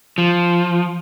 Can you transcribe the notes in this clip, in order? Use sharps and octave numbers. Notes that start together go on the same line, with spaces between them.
F3